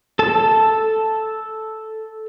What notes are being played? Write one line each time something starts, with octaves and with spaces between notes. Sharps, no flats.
A4 A5